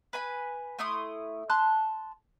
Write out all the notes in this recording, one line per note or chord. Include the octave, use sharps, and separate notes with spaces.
B4 G#5 B5
A3 E4 C6 D#6
A5 C6 F#6